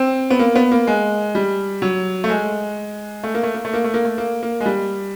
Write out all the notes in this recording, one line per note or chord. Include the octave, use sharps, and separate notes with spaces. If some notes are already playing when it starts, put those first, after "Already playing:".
Already playing: C4
B3
A#3
B3
A#3
G#3
G3
F#3
A3
G#3
A3
A#3
A3
A#3
A3
A#3
A3
A#3
A3
A#3
A#3
G#3
G3